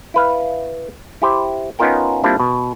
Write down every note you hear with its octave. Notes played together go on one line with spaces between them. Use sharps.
E4 B4 F5
E4 G4 C5
B3 C#4 D#4 F4 A#4 G5
G3 A#3 C4 D4 E4 F4
B2